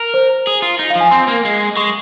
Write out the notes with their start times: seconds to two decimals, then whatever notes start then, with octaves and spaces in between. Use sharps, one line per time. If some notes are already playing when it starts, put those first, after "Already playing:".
Already playing: A#4
0.14 C5
0.47 G#4
0.62 F4
0.79 D#4
0.90 F5
0.95 F3
1.01 G#5
1.11 C4 C6
1.28 A#3
1.45 G#3
1.76 G#3 C#6